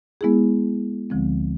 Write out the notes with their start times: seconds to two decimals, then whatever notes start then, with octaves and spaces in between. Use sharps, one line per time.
0.21 G#3 B3 E4 G#4
1.10 D2 D3 F3 G#3 C4